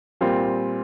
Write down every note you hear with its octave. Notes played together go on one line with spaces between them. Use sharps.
A#2 G3 C4 F4